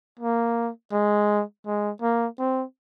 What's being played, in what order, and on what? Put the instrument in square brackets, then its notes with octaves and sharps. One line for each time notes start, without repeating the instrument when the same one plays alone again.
[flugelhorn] A#3
G#3
G#3
A#3
C4